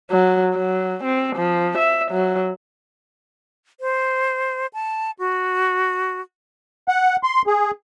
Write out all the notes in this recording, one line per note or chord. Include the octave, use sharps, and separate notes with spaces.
F#3
F#3
C4
F3
E5
F#3
C5
A5
F#4
F#5
C6
G#4